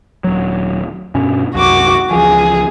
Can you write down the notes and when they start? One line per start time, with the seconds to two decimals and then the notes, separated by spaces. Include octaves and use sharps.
0.24 D#1 F#3
1.15 G2 B2 C#4
1.54 C2 F#2 F#4 D6
2.11 C#2 E3 F3 G#4